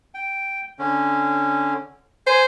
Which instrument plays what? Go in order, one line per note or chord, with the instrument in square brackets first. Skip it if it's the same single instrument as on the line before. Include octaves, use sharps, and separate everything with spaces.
[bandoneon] G5
D3 C#4
[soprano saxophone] C5 [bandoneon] G#5